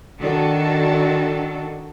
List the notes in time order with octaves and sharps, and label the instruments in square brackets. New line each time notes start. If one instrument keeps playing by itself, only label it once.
[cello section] D#3 D4 F#4 A4